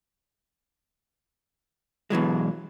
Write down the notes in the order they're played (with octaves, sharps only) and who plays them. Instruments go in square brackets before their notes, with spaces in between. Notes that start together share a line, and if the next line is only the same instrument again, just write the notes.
[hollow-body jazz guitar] B2 E3 F#3 G#3